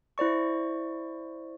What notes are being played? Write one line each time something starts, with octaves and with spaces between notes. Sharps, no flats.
E4 C5 D5 C#6